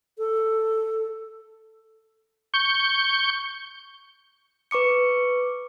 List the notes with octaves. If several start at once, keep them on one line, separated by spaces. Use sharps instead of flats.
A4
C#6 G6
B4 C#6 D6 C#7